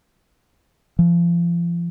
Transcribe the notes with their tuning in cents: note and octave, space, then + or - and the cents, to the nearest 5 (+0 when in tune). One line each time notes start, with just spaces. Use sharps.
F3 -35